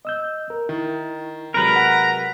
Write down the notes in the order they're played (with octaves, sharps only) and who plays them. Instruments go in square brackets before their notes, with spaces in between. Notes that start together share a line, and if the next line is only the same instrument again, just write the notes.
[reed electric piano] D#5 E6 G6
A#4
[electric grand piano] D#3 [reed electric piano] E4
[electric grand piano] C3 F#3 G#3 [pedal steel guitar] A#4 B4 [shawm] A#5
[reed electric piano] F#5 B5